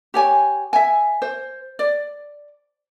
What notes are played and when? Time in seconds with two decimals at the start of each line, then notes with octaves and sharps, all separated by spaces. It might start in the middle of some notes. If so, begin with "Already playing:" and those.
0.14 G4 C#5 G#5
0.73 E5 G#5
1.22 C5
1.79 D5